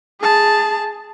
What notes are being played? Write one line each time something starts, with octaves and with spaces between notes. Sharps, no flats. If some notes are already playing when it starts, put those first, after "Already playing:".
G#4 A5